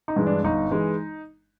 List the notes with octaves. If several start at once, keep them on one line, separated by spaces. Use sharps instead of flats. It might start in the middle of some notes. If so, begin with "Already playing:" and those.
D#4
G2 E3 G#3
D4
G1 D#4
E3 G#3